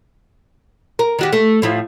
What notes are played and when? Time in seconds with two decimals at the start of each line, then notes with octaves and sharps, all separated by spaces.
0.99 A#4
1.19 D#3 F#4 G4
1.33 A3
1.62 A2 F3 E4